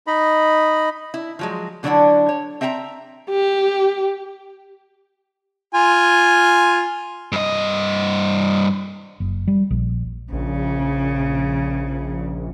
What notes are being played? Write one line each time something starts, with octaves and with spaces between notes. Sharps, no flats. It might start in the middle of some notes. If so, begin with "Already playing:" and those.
D#4 D#5 B5
E4
F3 F#3 G#3
B2 D3 F#3 D4 E4 F#5
C#5
C4 E5 G5 A5 A#5
G4
F4 G#5
G2 D#5
F#1
G3
A#1
A#1 C#3